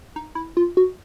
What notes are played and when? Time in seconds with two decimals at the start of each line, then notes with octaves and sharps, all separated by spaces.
0.16 D#4
0.35 E4
0.57 F4
0.77 F#4